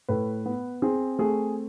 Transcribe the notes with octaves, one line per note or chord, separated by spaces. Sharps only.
A2 B4
B3
C4 G#4
A3 G#4